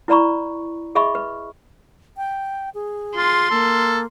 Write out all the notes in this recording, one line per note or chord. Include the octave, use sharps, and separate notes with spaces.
E4 B4 D5 A#5 B5 C#6
G#4 D#5 E5 B5 C#6
B4
G5
G#4
F4 C6
A#3 A4